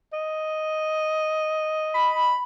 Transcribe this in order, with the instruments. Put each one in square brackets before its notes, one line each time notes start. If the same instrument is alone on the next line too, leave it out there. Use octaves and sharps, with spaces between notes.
[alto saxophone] D#5
[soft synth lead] B5